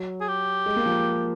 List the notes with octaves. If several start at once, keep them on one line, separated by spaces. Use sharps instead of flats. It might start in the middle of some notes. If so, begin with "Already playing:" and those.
Already playing: F#3
G#4
G4
G#3
A#3
F3